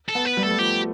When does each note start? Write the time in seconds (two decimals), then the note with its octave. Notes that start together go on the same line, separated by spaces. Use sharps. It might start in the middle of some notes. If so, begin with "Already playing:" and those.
0.09 A4
0.15 B3
0.26 B4
0.37 G3
0.43 A3 A4
0.51 G3
0.59 F3 G4